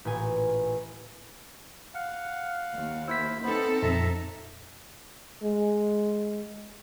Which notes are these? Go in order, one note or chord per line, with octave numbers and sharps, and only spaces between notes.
A1 A#2 G#5
F5 F#5
D#2
E4 C5 E6 B6
B3 C4 D#4 A4 C5 B5
F2 A#2 F3 E5 A#5
G#3